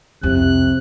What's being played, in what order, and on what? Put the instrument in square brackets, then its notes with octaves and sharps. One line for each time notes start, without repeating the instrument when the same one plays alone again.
[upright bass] C2 F2 [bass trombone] C3 [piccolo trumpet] F#6